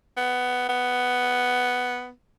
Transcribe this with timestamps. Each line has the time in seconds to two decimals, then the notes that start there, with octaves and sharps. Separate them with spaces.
0.17 B3
0.69 B3